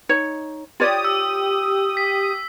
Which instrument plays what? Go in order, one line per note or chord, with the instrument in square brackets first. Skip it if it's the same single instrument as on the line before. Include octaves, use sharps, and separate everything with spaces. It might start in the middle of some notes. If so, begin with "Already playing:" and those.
[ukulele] D#4 C#5
[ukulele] F4 C#5 D5 [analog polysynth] G4 D#6
[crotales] E6
B6